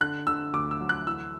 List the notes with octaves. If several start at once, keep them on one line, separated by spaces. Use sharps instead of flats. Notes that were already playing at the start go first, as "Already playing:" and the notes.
D3 F#6
D3 E6
D2 D6
E6
F#3
F#6
E3 E6